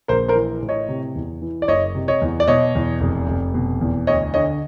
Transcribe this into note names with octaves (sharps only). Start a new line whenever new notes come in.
A#1 A#4 C5
A#4 C5
E3
A2
C#5 D#5
C3
E2
E3
D5
F#1 C#5 D#5
C3
C#5 D#5
E2
D5
B2 C#5 D#5
E2
F1
F1
B2
E2
D2 C#5 D#5
D3 C#5 D#5